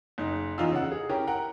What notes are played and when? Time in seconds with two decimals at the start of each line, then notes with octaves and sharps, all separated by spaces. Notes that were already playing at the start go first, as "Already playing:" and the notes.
0.18 F#1 D#4
0.58 E2 E3 D#4 F4 F5 E6
0.71 C#3 F#5
0.92 G#4
1.09 C#4 E4 G4 A#4
1.27 A#4 F#5 G5 A#5